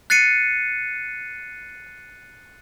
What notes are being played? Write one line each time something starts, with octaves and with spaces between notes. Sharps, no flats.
F#6 A6 C7 C#7 D#7